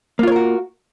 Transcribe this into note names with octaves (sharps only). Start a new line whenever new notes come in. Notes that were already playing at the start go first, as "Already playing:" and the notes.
A#3 F4 F#4 A#4 C#5